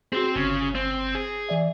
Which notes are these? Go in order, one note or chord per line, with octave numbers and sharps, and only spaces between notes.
C4 F#4 G#4 C5
G1 C#3
C4
G#4
E3 D5 E5